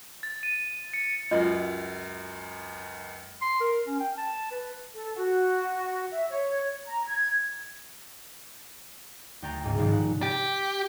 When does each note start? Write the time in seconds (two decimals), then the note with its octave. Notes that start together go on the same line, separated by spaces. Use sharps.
0.23 A6
0.43 D#7
0.94 C#7
1.31 C#2 F#2 F4 D#5
3.41 C6
3.61 A#4
3.87 C#4
4.00 G5
4.17 A5
4.51 B4
4.95 A4
5.16 F#4
6.12 E5
6.30 C#5
6.87 A#5
7.07 G#6
9.42 D2 G5 A#5 A6
9.64 C#2 G#2
9.78 A#1 G#2 C3 D#3 F3
9.92 F#5
10.22 G4